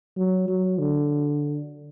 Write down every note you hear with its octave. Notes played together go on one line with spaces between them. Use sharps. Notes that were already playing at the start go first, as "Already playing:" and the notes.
F#3
F#3
D3